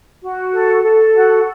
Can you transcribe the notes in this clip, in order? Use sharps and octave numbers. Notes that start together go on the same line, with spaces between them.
F#4
A4
A4
F#4